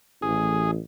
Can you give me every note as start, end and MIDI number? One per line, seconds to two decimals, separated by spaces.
0.22 0.77 33
0.22 0.71 68